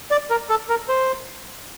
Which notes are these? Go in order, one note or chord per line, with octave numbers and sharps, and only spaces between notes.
D5
A#4
A4
A#4
C5